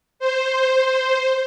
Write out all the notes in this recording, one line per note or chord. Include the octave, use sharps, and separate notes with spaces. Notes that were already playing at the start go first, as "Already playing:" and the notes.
C5